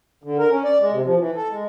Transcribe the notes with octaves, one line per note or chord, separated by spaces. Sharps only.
D3
A#4
C#4
D5
G#3
C3
F3
E3
A4
G#3